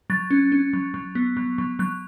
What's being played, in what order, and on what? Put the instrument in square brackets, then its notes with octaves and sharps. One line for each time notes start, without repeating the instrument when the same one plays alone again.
[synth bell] F#3 A6
C#4
C#4
F#3
F#3
B3
F#3
F#3
F#3 F#6